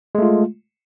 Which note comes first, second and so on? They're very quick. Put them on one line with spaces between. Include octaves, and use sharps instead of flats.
G#3 A3 F4